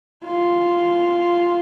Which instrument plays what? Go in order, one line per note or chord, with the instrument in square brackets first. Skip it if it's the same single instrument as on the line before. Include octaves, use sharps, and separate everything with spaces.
[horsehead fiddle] F4